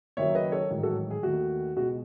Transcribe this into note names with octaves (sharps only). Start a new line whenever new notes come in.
F#1 F#2 D#3 F#3 C#5 E5
B4 D#5
A4 C#5
A1 G#2 D#3 F#3
F#4 A4
G#4
D#2 D#3 A3 F#4
C#2 B2 G#3 F#4